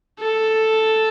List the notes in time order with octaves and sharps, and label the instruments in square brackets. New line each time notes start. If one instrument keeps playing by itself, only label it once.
[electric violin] A4